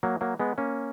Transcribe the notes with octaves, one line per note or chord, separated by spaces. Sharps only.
F#3 A#3
F#3 A#3
G#3 B3
A#3 C#4